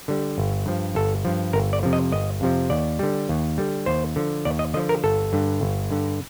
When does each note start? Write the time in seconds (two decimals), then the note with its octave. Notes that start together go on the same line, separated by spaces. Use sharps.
0.08 D3 G3
0.38 G1
0.66 G2 F3
0.95 G1 A4
1.25 G2 F3
1.53 G1 A#4
1.73 D5
1.83 F2 C3 F3
1.93 D#5
2.12 G1 D#5
2.41 F2 C3 F3
2.70 D#2 D5
2.99 D3 G3
3.29 D#2
3.58 D3 G3
3.86 D#2 C5
4.16 D3 F3
4.45 D#2 D5
4.59 D#5
4.74 D3 F3 D#5
4.89 A#4
5.04 G1 A4
5.33 G2 D3
5.61 G1
5.91 G2 D3